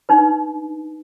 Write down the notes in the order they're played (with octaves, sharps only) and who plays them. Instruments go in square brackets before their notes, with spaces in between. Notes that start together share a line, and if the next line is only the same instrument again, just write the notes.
[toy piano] D4 D#4 B4